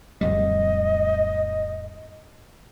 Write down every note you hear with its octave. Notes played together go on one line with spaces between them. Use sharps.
D1 F2 G3 D#5